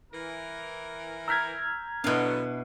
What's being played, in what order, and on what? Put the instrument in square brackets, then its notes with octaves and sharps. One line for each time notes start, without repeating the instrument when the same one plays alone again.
[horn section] E3 A#4
[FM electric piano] A#5 F6 G#6 [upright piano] E6 G6 B6
[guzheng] B2 F5 [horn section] D3 F#3 B3 [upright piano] D4 E4 B4